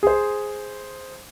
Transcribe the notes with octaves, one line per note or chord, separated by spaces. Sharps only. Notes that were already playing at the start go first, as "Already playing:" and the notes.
G#4 C5